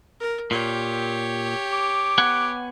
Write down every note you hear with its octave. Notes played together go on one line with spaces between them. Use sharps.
A#4
A#2 G4 C#5
D6
B3 F#5 G#5